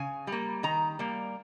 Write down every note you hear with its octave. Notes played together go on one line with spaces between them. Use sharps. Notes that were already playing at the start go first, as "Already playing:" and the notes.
Already playing: C#3 G#5
G3 A#3
D#3 A#5
G3 A#3